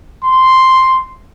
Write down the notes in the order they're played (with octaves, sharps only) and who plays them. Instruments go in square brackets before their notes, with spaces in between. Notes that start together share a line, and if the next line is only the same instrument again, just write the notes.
[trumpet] C6